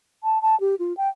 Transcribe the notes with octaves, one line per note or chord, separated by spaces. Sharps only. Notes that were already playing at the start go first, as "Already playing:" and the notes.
A5
A5
G4
F4
G5